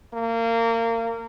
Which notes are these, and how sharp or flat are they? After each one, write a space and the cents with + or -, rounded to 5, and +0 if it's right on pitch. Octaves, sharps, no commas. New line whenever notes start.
A#3 -25